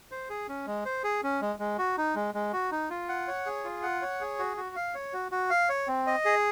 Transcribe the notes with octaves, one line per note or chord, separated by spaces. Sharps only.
C5
G#4
C#4
G#3
C5
G#4
C#4
G#3
G#3
F#4
D#4
G#3
G#3
F#4
D#4
F4
F#5
C#5
G#4
F4
F#5
C#5
G#4
F#4
F#4
F5
C#5
F#4
F#4
F5
C#5
C4
D#5
G#4